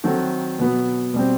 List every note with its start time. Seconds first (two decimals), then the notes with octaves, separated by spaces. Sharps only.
0.04 D#3 F#3 C4 F#4 A4
0.59 B2 F#3 B3
1.14 B2 G3 C4